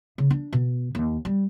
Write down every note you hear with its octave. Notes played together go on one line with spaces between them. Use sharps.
C#3
D4
B2
D#2
G3